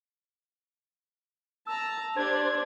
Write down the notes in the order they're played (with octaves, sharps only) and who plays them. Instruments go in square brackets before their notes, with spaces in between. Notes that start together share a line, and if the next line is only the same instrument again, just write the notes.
[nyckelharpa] A5 A#5 [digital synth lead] E6
[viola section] D4 [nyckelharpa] G4 [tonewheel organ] C5 [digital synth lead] G#6